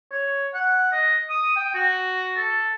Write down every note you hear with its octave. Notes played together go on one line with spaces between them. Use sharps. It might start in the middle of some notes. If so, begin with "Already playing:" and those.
C#5
F#5
D#5
D#6
G5
F#4
A4